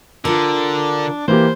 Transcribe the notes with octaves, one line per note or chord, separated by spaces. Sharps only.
D3 D4 F4 A#4
E3 A#3 G4 C5